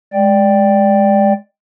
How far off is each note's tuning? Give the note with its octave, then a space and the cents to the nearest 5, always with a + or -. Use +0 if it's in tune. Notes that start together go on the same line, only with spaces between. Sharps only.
G#3 +0 D5 +0 G5 +0